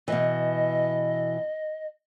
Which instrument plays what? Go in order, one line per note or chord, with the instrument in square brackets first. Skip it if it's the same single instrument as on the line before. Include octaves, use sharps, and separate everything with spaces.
[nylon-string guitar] B2 E3 [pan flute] D#5